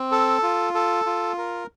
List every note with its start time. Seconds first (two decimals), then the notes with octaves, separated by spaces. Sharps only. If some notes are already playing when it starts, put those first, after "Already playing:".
Already playing: C4
0.12 A4
0.43 F4
0.75 A4
1.06 F4
1.38 A#4